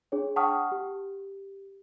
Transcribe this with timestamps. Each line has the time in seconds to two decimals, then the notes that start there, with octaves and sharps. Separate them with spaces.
0.12 D4 G#4 C#5
0.36 F#5 G5 A5 C#6 D#6 F6
0.72 G4